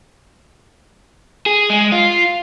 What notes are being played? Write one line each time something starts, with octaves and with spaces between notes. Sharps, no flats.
G#4
G#3
F4